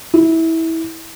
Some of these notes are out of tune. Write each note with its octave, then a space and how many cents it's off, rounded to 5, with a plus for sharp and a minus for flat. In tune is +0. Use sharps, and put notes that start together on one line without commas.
E4 -20